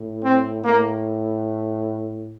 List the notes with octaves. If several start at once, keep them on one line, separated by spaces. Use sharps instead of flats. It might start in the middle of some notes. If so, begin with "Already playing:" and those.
Already playing: A2
C4
A2 A#3